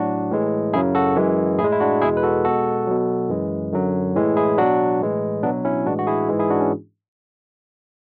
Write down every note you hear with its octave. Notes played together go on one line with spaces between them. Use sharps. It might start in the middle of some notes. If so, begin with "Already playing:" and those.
Already playing: A2 F#3 D4 F#4
A2 E3 G#3
F#2 C#3 F#3 E4 G#4
F#4 A4
F#2 E3 G#3
A2 E4 G#4
G#3
E4
D4 F#4
E2 B2 G#3 E4 G#4
B4
F#4 A4
B2 G#3 F#4 A4
B2 F#3
F#2 E3 G#3
F#2 D3 F#3
A2 E3 G#3
E4 G#4
B2 F#3 D4 F#4
A2 E3 G#3
B2 F#3 B3 D4
C#4 E4
A2 E3 G#3 D4 F#4
F#4
E4 G#4
G#2 E3 G#3
E4 G#4
D4 F#4
C#4